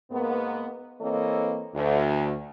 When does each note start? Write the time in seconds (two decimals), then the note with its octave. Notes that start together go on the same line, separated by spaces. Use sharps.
0.11 G#2 A#3 B3
1.01 E3 A#3 C4 A4 C#5 D#5
1.74 D2